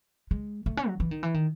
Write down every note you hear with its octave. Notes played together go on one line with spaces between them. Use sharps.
G#3
A3
C#4
F#3
E3
D#3
E3
D#3